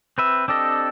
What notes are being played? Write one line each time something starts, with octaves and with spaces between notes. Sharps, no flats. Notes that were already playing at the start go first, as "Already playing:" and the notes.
C4 B4 E5
C4 D4 G4 A4 D#5